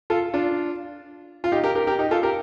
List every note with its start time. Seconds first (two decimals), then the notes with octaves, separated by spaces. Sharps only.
0.10 F4 A4
0.34 D4 F4
1.44 F4
1.52 D#4 G4
1.64 G4 A#4
1.75 G4 A#4
1.87 G4 A#4
1.99 D#4 G4
2.11 F4 A4
2.23 G4 A#4